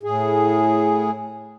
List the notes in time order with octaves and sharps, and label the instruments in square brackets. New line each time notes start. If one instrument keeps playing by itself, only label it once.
[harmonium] A2 G#4